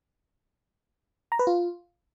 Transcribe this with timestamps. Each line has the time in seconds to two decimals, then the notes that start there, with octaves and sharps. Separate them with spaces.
1.32 A#5
1.39 B4
1.47 F4